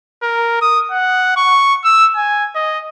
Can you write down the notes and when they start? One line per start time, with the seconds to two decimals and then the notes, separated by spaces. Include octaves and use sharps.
0.23 A#4
0.62 D#6
0.91 F#5
1.36 C#6
1.84 E6
2.16 G#5
2.55 D#5